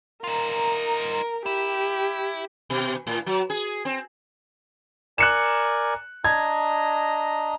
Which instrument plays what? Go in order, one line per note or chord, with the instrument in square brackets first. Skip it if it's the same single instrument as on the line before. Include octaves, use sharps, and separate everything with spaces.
[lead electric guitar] D#4 F4 [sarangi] A#4
[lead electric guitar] E4 [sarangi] G4
[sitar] B2
A2
F#3
G#4
C4
[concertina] A#4 D5 G#5 [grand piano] F#6 C#7 E7
[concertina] D4 D#5 A#5 [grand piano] G#6